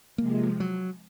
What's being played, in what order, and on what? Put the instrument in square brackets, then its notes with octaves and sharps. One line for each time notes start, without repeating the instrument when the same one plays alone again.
[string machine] C3 F3 G#3 [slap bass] A#3
[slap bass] F#3